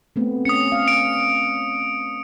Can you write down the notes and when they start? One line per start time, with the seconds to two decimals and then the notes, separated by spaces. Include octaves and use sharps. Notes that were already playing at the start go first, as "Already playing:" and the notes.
0.16 A3 B3 C4
0.45 C#4 D#6 C#7
0.72 F5
0.88 D7